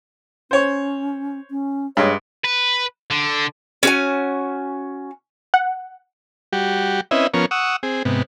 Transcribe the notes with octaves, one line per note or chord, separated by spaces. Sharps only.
C#4 C5 C#5
C#4
G2 G#3 C#5
B4
D3
C#4 F#4 G#5
F#5
G3 F#4 G4
C4 C#4 E4 B4 D#5 E5
F3 B3 C#4 A#4 C#6
F#5 C#6 D#6 E6
C4 G#4
G#2 C3 B3